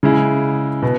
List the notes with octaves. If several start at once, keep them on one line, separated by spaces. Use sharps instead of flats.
C#3 G#3 E4
B2